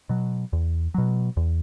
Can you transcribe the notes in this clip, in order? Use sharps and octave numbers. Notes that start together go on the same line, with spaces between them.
B2 F#3
E2
B2 F#3
E2